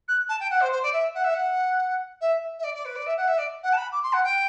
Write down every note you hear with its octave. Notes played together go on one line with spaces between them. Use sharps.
F#6
A5
G5
F#5
C5
C5
D5
E5
F#5
E5
F#5
E5
E5
D5
D5
B4
D5
E5
F#5
E5
D5
F#5
A5
B5
D6
C6
F#5
G5